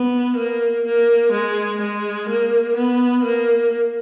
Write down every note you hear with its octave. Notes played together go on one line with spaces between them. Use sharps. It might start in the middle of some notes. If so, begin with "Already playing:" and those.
Already playing: B3
A#3
A#3
G#3
G#3
A#3
B3
A#3